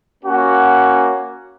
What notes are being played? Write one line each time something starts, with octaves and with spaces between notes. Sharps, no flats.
A#3 C#4 F#4